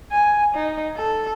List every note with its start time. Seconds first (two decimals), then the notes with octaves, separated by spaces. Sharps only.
0.12 G#5
0.55 D#4
0.97 A4